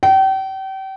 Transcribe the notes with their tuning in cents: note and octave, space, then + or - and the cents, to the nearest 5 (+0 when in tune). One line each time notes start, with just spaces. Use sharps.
G5 -35